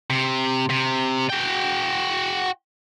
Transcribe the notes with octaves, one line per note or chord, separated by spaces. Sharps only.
C3
C3
F#4 G5